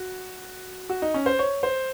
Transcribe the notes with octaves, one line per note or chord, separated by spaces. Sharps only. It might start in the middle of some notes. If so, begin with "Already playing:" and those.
Already playing: F#4
F#4
D#4
C#4
C5
C#5
C5